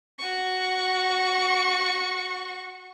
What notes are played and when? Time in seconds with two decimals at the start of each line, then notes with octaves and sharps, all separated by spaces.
0.19 F#4 C#6